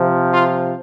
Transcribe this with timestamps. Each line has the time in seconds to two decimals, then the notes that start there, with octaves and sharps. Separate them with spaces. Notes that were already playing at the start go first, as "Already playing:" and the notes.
Already playing: C3 F3
0.33 F4